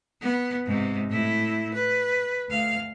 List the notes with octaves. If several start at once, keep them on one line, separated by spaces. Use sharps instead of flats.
B3
G#2 C3
A2 E4
B4
D2 F5